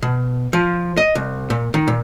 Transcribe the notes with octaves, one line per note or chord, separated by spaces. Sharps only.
B2
F3
D#5
C2
A#2
D#3
A#2